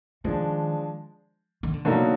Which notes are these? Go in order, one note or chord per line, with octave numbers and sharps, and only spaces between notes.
D#3 F3 G#3 D4
D#3
D3
B2 D3 F#3 A#3 D#4